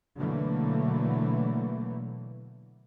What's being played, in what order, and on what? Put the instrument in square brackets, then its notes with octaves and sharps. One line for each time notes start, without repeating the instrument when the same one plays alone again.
[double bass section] B2 D3 E3 F#3 A3 A#3